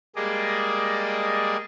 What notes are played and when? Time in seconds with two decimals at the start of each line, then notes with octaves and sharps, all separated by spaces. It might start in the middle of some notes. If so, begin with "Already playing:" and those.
0.16 G3 G#3 A#3 G#4 D5 D#5